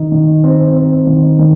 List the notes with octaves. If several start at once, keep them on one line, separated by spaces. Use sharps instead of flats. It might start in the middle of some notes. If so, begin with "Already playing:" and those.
Already playing: D#3 D#4
D#3
C4
C4
D#3
D#3